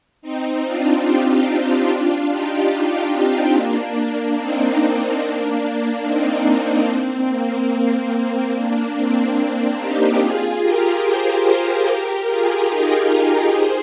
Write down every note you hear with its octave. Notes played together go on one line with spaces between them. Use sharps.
C4 D#4
D4 F4
D#4 G4
D4 F4
D#4 G4
D4 F4
C4 D#4
A#3 D4
C4 D#4
A#3 D4
C4 D#4
A#3 D4
C4
A#3
C4
C4
A#3 D4
C4
C4
D#4 G4
F4 G#4
G4 A#4
G#4 C5
G#4 C5
G4 A#4
F4 G#4
D#4 G4
F4 G#4
G#4 C5